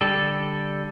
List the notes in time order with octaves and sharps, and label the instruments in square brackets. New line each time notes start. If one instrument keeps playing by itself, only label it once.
[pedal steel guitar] D3 G3 A4